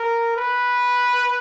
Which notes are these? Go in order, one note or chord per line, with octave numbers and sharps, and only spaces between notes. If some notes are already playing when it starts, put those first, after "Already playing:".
Already playing: A#4
B4